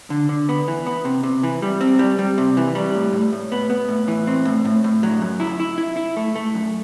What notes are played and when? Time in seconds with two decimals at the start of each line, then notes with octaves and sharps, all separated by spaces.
0.10 D3
0.29 D3
0.49 B3
0.68 E3
0.86 B3
1.05 C3
1.23 C3
1.43 E3
1.62 G3
1.81 C4
1.99 G3
2.19 G3
2.38 C3
2.57 E3
2.75 G3
2.95 A2
3.13 A2
3.33 A2
3.52 B3
3.70 B3
3.89 A2
4.08 E3
4.27 C4
4.45 A2
4.65 A2
4.84 A2
5.03 F#3
5.22 F#2
5.40 E4
5.60 E4
5.78 E4
5.97 E4
6.17 A3
6.36 A3
6.55 F#2